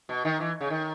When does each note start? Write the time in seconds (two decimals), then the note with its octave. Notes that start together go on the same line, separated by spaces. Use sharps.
0.09 B2
0.25 D#3
0.40 E3
0.60 C#3
0.70 D#3